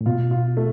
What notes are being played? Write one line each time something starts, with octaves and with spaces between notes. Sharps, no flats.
A2
B2 F4
F4
A3